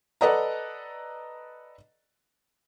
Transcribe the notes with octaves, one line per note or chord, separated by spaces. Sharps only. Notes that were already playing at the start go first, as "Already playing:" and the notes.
A4 B4 D5 D#5 F#5 A#5